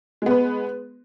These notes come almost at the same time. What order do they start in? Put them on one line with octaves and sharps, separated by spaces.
G#3 B3 B4